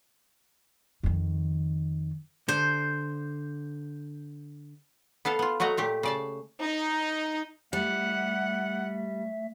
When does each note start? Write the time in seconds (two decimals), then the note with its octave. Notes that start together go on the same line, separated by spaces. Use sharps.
1.03 F2 D#3
2.48 D3 C5
5.25 B3 A4 F5 A5
5.39 B3 F4
5.60 F#3 A3 F#4 D#5 A#5
5.77 A#2 A3 G4
6.03 C#3 D5 A5
6.60 D#4
7.73 G3 A3 E5 F#5